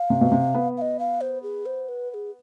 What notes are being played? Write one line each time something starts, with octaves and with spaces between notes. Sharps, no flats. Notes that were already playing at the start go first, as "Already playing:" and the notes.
Already playing: F5
C3
B2
C3
B3
F5
D#5
F5
C5
G#4
C5
B4
B4
G#4